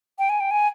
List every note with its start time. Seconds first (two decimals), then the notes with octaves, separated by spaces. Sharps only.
0.19 G5
0.29 G#5
0.40 G5
0.51 G#5